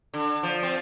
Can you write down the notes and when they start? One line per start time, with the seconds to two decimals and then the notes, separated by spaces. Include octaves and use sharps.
0.14 D3
0.43 F3
0.63 C4